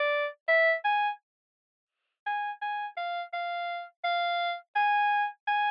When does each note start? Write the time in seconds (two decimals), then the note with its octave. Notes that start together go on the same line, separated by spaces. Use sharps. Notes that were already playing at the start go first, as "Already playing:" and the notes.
Already playing: D5
0.48 E5
0.84 G#5
2.26 G#5
2.62 G#5
2.97 F5
3.33 F5
4.04 F5
4.76 G#5
5.48 G#5